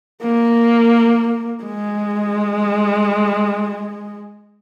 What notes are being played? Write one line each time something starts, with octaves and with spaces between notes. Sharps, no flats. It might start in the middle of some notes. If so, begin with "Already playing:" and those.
A#3
G#3